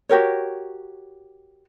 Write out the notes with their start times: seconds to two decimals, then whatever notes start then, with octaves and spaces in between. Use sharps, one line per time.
0.09 F#4 G4 A#4 C#5